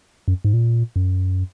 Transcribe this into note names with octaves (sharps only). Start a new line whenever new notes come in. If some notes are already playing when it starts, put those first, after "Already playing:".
F#2
G#2
A#2
F#2